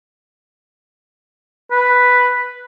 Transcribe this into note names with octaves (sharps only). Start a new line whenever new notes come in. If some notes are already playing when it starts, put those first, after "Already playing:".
B4